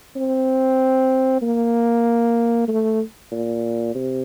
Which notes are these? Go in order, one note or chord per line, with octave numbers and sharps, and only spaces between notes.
C4
A#3
A3
A#2
C3